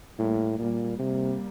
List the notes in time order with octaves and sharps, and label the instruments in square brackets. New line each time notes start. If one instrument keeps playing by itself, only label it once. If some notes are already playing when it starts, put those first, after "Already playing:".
[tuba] A2 [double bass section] G3 A#3
[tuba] A#2 [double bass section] G3 A#3
[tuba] C3 [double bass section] G3 A#3